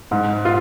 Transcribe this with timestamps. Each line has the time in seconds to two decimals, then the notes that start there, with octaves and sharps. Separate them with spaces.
0.11 G#2
0.45 F4